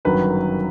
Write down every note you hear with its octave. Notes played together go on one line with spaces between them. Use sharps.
G1 F#2 D#3 F#3 B4